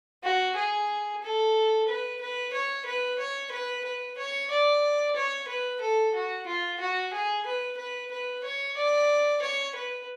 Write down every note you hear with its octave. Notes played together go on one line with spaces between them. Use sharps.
F#4
G#4
A4
B4
B4
C#5
B4
C#5
B4
B4
C#5
D5
C#5
B4
A4
F#4
F4
F#4
G#4
B4
B4
B4
C#5
D5
C#5
B4